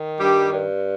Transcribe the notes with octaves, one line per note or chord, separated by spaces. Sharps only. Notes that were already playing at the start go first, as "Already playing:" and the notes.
Already playing: D#3
G2 G3 G4
G2